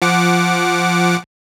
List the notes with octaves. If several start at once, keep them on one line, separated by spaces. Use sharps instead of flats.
F3 F#5 D6